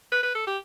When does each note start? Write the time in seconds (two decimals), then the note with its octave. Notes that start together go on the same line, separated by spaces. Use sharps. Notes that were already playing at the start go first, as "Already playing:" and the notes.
0.12 B4
0.23 B4
0.35 A4
0.47 G4